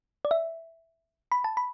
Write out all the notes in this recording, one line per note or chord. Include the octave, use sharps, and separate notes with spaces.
D5
E5
B5
A5
B5